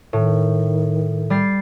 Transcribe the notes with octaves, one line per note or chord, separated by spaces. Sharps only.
A2 D#3
G3 A6 C7